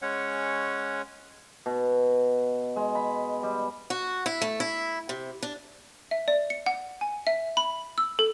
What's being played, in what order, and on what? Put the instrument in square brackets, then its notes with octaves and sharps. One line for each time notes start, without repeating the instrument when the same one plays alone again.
[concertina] G#3 C#4 C#5 F#5
[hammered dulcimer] B2
G#3
B5
G3
[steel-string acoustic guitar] F#4
E4
A3
E4
C3
D4
[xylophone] E5
D5
C#7
F#5
G#5
E5
B5
E6
A4